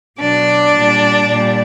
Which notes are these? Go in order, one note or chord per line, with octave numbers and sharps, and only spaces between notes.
B2 F#3 D4 D5
A#2 G3
A#2 G3